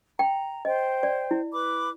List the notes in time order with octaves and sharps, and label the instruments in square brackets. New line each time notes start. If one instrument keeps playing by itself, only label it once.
[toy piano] G5 [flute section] A#5
[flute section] C5 G5 [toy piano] D#5
[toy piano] D5
E4
[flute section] B4 B5 D6